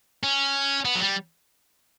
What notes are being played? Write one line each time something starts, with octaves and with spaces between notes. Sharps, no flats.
C#4
B3
F#3
G3